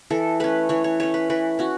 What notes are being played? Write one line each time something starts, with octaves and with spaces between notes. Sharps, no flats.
E3 A4
A3 C#4 B4
E3 C#5
C#5
A3 C#4 C#5
B4
E3 B4
C#4 F#4